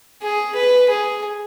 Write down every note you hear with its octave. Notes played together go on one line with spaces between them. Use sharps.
G#4
B4
G#4